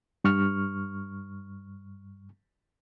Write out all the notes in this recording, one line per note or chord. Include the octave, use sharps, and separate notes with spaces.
G2 C#6 F6